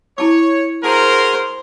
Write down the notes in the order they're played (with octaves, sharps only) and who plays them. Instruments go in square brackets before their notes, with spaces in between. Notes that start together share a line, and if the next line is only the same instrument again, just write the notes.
[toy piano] E4 A5 D6 [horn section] C#5
[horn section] F#4 G#4 A#4 [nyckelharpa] C5 [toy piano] A5 A#5